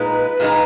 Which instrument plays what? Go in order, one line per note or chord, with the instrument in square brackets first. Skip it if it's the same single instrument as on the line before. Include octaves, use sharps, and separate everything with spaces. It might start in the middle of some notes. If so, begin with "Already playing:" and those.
Already playing: [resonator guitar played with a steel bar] A#2 G#3 D#4 [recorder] B4
[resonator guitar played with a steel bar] A#2 G#3 D#4